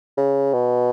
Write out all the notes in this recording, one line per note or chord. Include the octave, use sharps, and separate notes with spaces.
C#3
B2